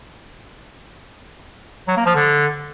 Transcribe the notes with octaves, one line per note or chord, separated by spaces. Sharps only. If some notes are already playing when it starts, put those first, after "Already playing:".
F#3
A#3
F3
D3